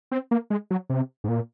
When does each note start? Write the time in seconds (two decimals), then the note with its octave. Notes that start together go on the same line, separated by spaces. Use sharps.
0.12 C4
0.31 A#3
0.50 G#3
0.71 F#3
0.90 C3
1.24 G#2
1.28 A#2